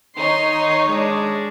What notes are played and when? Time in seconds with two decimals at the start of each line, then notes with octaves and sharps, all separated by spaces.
0.17 D#3 D#4 C#5 C6
0.87 G#3 D4